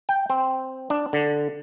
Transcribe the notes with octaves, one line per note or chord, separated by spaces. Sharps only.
G5
C4
D4
D3